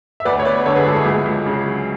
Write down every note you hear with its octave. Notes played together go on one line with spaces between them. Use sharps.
E5
D2 B4 D5
C#5
B3 B4 D5
D3 A4 C#5
G#4 B4
G#3 F#4 A4
E4 G#4
C#2
C#2
C#3
F#3